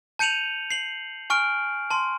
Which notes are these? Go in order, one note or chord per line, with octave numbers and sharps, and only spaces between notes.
A5 G6 C#7 D#7 F7 F#7
C7 F#7
G#5 C#6 F6 D7
A5 C6